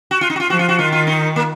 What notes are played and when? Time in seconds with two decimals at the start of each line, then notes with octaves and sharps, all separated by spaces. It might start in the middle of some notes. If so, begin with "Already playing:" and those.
0.11 F#4
0.21 F4
0.30 D#4
0.36 F#4
0.40 F4
0.49 F3 F#4
0.59 F4
0.69 F#4
0.79 D#3 F4
0.92 F4
1.07 D#4
1.36 A#3